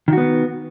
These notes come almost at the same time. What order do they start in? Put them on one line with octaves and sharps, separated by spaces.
D#3 F#4 B3